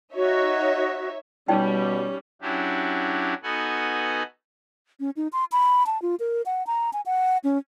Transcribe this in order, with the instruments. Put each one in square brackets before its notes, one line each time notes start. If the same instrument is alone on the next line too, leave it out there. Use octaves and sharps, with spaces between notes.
[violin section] D#4 C#5 E5 [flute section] F#4 D#5
[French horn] B2 [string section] G3 [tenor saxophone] C#4 [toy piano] D#4 D5 G5
[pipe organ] F#3 C#4 D4 E4 F#4 G4
B3 D#4 F#4 A4 F#5 G#5
[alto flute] C#4
D#4
C6
B5
A5
F4
A#4
F#5
A#5
G#5
F#5
C#4